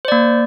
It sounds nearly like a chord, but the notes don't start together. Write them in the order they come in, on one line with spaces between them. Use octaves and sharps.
C5 D5 A#3